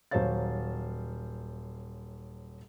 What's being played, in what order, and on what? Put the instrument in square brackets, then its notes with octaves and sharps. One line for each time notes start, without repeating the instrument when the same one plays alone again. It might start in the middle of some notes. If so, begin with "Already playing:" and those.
[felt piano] D#1 F#3 C5 C#5 F5 A6